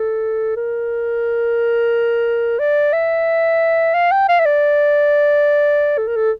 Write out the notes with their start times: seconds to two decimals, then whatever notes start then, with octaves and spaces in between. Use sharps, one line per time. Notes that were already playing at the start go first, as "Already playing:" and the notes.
Already playing: A4
0.57 A#4
2.59 D5
2.93 E5
3.94 F5
4.12 G5
4.29 F5
4.40 E5
4.45 D5
5.98 A4
6.08 A#4
6.16 A4